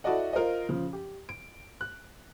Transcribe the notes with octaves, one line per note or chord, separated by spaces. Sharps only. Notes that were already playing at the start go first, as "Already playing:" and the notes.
E4 F#4 A4 D5 D#5 F#5
F4 A#4 C5 D#5
C#3 F3
G4
D7
F#6